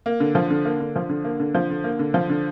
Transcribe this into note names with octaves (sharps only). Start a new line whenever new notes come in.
A#3
D3
F3
D3
A#3
D3
F3
D3
A#3
D3
F3
D3
A#3
D3
F3
D3